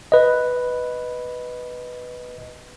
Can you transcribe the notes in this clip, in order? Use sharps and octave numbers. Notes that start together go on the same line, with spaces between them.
B4 D#5